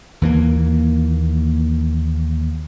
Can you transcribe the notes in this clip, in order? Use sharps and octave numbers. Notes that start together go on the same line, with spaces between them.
D#2 E3 A#3